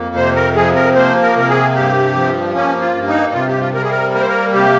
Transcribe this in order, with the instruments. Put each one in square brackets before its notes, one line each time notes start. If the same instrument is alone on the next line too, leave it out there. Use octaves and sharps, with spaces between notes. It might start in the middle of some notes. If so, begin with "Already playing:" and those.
Already playing: [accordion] F2 A#3
C3 C5
A#4
F3 G#4
A#4
A#3 C5
A#4
C3 A#4
G#4
G2 G4
F3
A#3 C#4
F4
G2
D#4
C3 F4
G4
F4
G3 A#4
G#4
A#4
A#3 A#4
C5
A#4
C3 G4